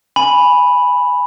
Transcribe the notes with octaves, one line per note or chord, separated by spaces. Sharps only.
G#5 B5